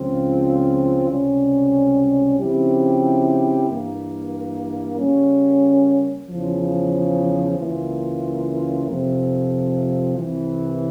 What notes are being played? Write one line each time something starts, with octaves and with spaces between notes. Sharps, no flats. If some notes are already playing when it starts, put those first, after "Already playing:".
Already playing: C#2 C#3 F3 C4 F4
C#2 C3 G3 C#4
C#3 F3 C4 E4 G4
G2 E3 A#3
C#3 G3 A#3 C#4
E2 C#3 F3
C#2 C#3 E3 A#3 F4
F2 C3 F3
C2 C3 E3